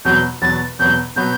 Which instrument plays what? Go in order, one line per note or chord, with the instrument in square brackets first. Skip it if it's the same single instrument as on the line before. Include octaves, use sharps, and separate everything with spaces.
[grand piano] E2 B2 F#3 B3 [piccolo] G6
[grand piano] E2 B2 F#3 B3 [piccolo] A6
[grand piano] E2 B2 F#3 B3 [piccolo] G6
[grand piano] B2 F#3 B3 [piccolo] G6